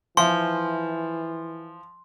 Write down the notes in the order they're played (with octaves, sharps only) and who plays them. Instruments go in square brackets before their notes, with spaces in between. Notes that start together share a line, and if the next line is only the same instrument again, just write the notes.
[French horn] E3 [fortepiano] F3 [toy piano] E5 F5 G#5 [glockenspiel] C6